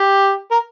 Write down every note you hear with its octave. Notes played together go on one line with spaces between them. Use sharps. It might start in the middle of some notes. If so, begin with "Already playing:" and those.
Already playing: G4
A#4